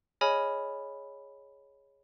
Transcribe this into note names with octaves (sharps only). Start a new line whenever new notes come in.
G#4 C#5 D#5 G#5 B5 F6